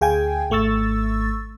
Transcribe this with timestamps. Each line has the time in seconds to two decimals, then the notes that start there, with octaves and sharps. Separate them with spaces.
0.01 D2 G#4 F5 G5 G#5 G#6
0.50 G#1 A3 C#6 E6 A6